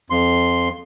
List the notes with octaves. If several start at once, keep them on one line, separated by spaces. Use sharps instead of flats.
F2 C6